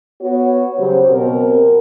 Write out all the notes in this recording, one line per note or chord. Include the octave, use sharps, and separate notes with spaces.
B3 F#4 C#5
C#3 F#3 G4 C5
B2 C4 A#4